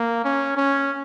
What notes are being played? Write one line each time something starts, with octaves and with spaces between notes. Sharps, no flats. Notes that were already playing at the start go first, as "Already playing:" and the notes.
Already playing: A#3
C#4
C#4